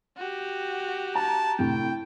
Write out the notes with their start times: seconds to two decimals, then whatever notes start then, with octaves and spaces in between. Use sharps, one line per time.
0.17 F#4 G4
1.15 A5 A#5
1.59 A2 C3 G5